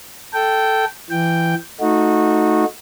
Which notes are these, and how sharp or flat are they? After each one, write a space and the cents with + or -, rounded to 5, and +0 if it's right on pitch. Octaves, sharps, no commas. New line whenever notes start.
A4 +0 G5 -10
E3 +20 G5 +0
A3 +0 D#4 +0 F#4 -20